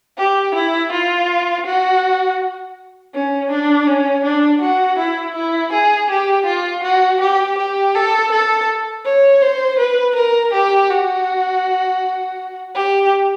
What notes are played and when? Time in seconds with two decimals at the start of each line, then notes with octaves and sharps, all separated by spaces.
0.18 G4
0.55 E4
0.92 F4
1.66 F#4
3.14 C#4
3.51 D4
3.87 C#4
4.24 D4
4.61 F#4
4.99 E4
5.35 E4
5.72 G#4
6.10 G4
6.46 F4
6.83 F#4
7.20 G4
7.58 G4
7.94 A4
8.31 A4
9.05 C#5
9.42 C5
9.79 B4
10.15 A#4
10.53 G4
10.90 F#4
12.75 G4